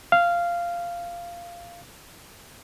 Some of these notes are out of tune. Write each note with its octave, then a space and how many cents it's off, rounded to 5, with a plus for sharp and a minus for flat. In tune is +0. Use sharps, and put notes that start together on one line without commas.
F5 -10